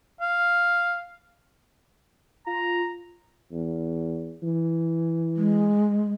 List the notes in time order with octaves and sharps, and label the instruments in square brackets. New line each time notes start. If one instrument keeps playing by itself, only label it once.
[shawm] F5
[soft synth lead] F4 [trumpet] A#5
[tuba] E2
E3
[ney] G#3